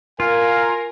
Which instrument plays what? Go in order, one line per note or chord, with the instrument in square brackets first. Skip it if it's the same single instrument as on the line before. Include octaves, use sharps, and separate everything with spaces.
[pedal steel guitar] F4 [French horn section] A#4 [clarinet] F5 [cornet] G#5